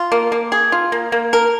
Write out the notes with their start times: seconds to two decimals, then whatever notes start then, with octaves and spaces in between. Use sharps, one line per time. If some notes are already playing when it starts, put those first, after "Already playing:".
Already playing: F4
0.12 A#3
0.32 A#3
0.52 G#4
0.72 F4
0.92 A#3
1.12 A#3
1.33 A#4